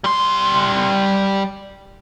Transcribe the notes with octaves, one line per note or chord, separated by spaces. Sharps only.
G3 C6